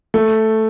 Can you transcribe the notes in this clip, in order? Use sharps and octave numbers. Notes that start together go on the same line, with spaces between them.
A3